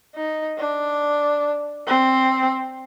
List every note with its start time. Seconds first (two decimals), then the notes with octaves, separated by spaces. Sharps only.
0.15 D#4
0.58 D4
1.87 C4